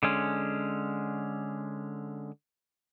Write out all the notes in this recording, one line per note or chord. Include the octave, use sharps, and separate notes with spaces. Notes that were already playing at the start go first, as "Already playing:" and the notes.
D3 G#3 C#4